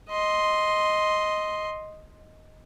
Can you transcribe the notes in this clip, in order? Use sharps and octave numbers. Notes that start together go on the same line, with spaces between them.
D#5 C6